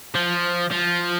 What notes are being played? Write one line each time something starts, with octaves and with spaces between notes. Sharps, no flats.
F3
F3